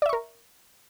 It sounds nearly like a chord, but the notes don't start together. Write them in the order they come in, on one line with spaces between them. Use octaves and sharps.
D5 E5 C#6 A#4